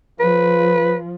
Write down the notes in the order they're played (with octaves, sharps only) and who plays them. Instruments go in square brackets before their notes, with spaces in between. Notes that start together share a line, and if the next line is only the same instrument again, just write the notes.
[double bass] F3 [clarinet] B4